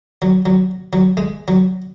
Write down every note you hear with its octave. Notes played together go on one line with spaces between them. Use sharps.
F#3
F#3
F#3
G#3
F#3